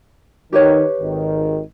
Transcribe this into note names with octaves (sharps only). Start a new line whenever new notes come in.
D#3 G4 B4 C#5
G#1 D#3